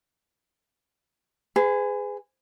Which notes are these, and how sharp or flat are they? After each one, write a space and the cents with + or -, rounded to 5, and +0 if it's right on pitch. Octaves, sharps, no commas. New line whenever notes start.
G#4 -5 B4 +40